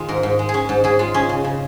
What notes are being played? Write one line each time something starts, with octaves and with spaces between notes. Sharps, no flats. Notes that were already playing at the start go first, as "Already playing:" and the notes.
Already playing: D#3 G#3 D#4 F4
G#2 A#4
G#2
G#3
G#4
C#4
G#2
G#2 G#4
G#3 F4
C#4 G#4
C#3
C#3